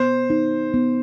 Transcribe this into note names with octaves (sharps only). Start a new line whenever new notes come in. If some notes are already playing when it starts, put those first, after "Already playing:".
Already playing: B3 C5
D#4
B3